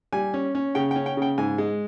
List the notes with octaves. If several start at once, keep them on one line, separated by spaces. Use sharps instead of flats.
G3 G#5
C#4
C#4
C#3 G5
G5
C#4
G5
C#3 G5
G#2 G#5
G#3